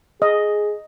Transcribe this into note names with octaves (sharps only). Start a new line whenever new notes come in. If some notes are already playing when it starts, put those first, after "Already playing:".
G#4 D#5